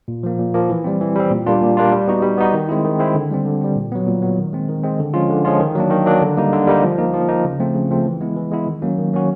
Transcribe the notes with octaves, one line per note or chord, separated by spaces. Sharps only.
A#2
F3 A#3
A#2
F3 A#3
E3
G3 C4
E3
G3 C4
A#2
G3 A#3 D4 F4
A#2
G3 A#3 D4 F4
G3
B3 D#4 F#4
G3
B3 D#4 F#4
D#3
G#3 C4 E4
D#3
G#3 C4 E4
D3
G3 C4
D3
G3 C4
A#2
F#3 B3
A#2
F#3 B3
D#3
G#3 C4
D#3
G#3 C4
D3
F3 G#3 C#4 F4
D3
F3 G#3 C#4 F4
D#3
F#3 A#3 D4
D#3
F#3 A#3 D4
D3
G3 A#3 D#4
D3
G3 A#3 D#4
F3
A#3 D#4
F3
A#3 D#4
C#3
F3 A3 C4
C#3
F3 A3 C4
E3
G#3 B3 E4
E3
G#3 B3 E4
D#3
F#3 A#3 C#4 F#4
D#3
F#3 A#3 C#4 F#4